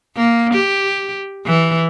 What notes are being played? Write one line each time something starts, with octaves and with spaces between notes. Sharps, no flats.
A#3
G4
E3